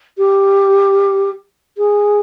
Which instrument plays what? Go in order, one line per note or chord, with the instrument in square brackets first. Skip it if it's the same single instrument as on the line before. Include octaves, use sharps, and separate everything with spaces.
[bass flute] G4
G#4